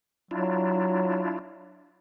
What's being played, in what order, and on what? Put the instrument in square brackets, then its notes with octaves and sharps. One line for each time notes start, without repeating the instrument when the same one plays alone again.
[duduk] F#3 [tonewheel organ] D4 E4 F4